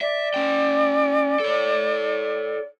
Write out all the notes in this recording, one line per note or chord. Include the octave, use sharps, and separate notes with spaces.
D5 E5
C#4 G5
A4 C#5